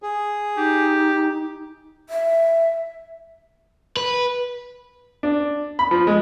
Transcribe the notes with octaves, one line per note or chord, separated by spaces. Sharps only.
G#4
D#4 G4
E5
B4
D4
B5
F3
G#3